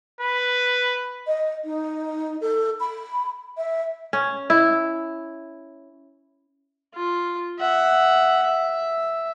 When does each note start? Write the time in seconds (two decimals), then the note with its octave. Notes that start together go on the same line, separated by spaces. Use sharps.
0.21 B4
1.27 D#5
1.65 D#4
2.41 A4
2.80 B5
3.58 E5
4.13 C#4
4.50 E4
6.94 F4
7.59 E5 F#5
8.43 E5